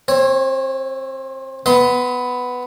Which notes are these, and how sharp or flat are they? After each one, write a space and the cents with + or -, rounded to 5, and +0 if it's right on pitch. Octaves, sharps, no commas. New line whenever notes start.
C4 +25 C#5 -15
B3 +5 D#5 +35 C6 -20